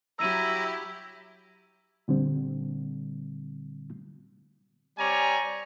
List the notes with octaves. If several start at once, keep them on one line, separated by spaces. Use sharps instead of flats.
F#3 E4 G4 A#5 E6 D#7
A#2 D3 G3 C4
G3 C4 C#5 D5 G#5 A#5